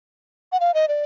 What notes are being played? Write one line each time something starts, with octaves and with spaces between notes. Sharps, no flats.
F#5
F5
D#5
D5